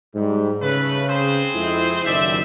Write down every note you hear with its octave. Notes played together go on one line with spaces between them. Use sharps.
G#2 G3
C#3 A3 B4
C4 G#4 C5
F2 G#3 E4
F#1 D#2 D#3 C5 D5 E5